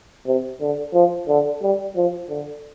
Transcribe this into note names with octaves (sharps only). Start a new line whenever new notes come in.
C3
D3
F3
D3
G3
F3
D3